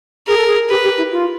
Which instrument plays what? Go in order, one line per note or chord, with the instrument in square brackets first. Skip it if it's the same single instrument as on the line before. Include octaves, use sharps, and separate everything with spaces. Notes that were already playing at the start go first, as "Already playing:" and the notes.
[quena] G#4 [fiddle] A#4
[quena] A4
G#4
[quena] G4 [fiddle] B4
[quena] G4
E4
F4